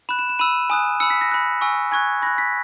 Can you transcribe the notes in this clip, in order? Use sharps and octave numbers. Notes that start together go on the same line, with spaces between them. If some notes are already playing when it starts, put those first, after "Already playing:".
B5 F#6 E7
E7
E7
B5 E6 D#7
G#5 D#6 F#6
B5 E6 C#7
B6
A#6
B5 F#6
G#5 C#6 E6
G#5 C#6 F#6 G#6
B5 F#6 A#6
B6